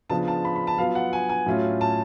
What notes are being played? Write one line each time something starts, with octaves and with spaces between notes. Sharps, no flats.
C#3 F3 B3 D4 F4 A5
A5
B5
B5
A5
F#3 B3 F4 F5
F#5
G#5
G#5
A2 F#3 A3 C#4 F4
A5